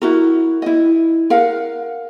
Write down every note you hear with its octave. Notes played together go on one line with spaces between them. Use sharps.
E4 F#4 A#4
E4 D#5
A#4 F5 F#5